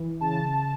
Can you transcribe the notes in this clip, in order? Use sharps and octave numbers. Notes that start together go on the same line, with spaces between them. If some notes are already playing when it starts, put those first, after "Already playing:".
Already playing: E3
C#3 A5